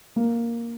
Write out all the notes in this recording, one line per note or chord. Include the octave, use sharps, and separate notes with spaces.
A#3